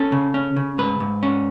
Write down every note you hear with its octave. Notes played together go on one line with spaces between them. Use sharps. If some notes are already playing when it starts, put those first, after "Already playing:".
Already playing: C#4 A4
C#3
C#4
C#3
G#2 B4
G#2
C#4